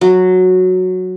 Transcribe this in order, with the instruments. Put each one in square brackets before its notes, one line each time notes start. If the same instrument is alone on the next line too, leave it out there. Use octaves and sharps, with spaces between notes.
[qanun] F#3